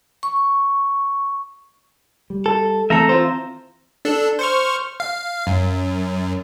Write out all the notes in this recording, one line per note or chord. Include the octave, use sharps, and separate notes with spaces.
C#6
G3
A4
E3 A3 C4 A4 E5 A#5
F4 C5
D4 A4
C5 C#6 F6
F5
F#2